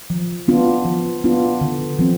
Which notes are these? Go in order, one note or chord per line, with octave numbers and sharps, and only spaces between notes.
F3
B3 D4 F4
F3
B3 D4 F4
D3
F3 C4